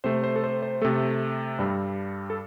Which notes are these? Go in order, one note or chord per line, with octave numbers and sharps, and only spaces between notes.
C3 A3 C5
C5
A4
C5
C5
C3 A3 A4
G2 G3
A4